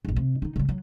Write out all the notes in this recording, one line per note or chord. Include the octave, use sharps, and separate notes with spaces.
F1 A#1
C3
D#3 D#4
C#3 G3
F#3